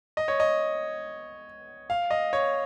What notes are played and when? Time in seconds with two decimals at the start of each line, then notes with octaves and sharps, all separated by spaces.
0.17 D#5
0.28 C#5
0.40 D#5
1.90 F5
2.10 D#5
2.33 C#5